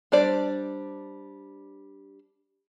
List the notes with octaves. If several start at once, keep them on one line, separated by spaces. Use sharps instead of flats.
G3 D4 C5 D5